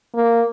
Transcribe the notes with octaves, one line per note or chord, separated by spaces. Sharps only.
A#3